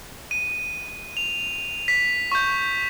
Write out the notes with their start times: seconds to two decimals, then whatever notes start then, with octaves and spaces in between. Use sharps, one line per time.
0.31 D#7
1.17 F7
1.88 B6
2.32 C#6 G6